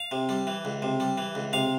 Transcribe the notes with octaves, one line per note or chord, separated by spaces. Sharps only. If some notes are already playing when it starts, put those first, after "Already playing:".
Already playing: F5
C3
G3
E3
C#2
C3
G3
E3
C#2
C3 F5